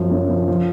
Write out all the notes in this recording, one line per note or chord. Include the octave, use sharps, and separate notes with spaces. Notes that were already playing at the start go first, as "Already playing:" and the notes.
Already playing: F#2 F3
F#2
F3
F3